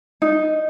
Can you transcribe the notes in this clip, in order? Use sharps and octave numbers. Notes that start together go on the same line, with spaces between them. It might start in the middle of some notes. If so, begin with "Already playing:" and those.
D#4